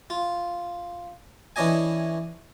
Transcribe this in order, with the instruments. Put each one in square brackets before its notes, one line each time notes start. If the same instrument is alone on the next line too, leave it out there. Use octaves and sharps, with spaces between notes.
[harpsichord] F4
E3 C#4 D4 D#5 G#5